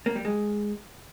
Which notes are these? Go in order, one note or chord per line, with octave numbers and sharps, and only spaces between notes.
A#3
G3
G#3